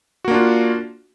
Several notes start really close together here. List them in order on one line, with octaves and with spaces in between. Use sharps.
F#4 A#3 D4 F4